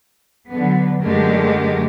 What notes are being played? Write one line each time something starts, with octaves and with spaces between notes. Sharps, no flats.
D3 F#3 B3
F#2 D3 G#3 A3 G4 A#4